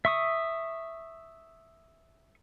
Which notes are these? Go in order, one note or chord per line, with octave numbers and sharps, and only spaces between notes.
E5 C#6 D#6